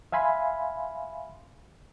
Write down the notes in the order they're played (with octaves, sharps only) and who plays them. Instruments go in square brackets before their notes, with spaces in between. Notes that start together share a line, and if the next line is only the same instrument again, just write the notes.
[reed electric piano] E5 F5 G#5 B5 C6